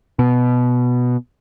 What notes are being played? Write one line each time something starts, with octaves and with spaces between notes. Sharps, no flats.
B2